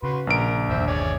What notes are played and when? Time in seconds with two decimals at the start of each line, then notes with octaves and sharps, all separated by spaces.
0.03 C#3 F#4 B4 C6
0.27 A#1 A#4 D7
0.69 G1 D#2 D3 C5 E5 G5
0.87 G#4 C#5 D5